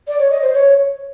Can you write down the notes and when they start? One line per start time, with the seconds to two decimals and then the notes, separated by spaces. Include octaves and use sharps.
0.07 D5
0.19 C#5
0.30 D#5
0.42 C5
0.53 C#5